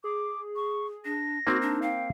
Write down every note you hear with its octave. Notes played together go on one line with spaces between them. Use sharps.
G#4 D6
C#6
D4 A#6
A#3 C4 D#4 F#4
D4
F5 G5